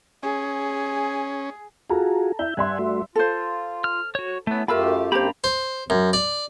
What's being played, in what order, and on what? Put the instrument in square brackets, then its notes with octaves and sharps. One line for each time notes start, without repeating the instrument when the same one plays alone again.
[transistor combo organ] C#4 [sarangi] G#4
[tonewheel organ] F4 F#4 G#4 [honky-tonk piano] A4 A5 A#5
[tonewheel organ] E4 G6 [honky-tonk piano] E5
[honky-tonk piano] G2 E5 C6 [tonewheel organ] F#5 G#5
[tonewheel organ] A3 F#4
[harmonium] F4 [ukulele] A4 C5
[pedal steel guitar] F6
F#4 C#5
[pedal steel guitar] A3 B3 [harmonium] C#4 E4
[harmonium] F#2 A3 G4 [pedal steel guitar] F4 F5 E6 [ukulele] A#4 B5
[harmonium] F#2 A#3 C4 [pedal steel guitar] D4 A#5 B5 [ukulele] G4 C5
[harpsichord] C5
F#2
D5